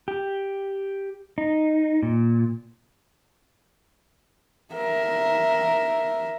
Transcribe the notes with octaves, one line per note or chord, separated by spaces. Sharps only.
G4
D#4
A#2
A#4 E5